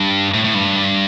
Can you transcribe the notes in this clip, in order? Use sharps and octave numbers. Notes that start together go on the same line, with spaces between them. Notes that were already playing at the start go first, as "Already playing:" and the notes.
Already playing: G2
A2
A2
G2